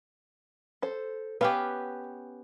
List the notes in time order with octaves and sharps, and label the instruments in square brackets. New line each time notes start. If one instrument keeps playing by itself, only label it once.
[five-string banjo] A4 C5
[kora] B3 C#4 G4 [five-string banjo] B4 F5